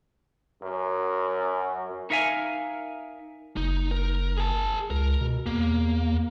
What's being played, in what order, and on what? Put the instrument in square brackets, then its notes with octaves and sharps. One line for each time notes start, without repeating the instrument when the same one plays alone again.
[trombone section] F#2
[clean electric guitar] D#4 A#4 E5 F5 G#5
[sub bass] F#1 [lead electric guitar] D#4
[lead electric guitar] A#4
G#4 A5
[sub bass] C#2 [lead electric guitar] A#4
[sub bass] B2
[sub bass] E2 [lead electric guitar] A#3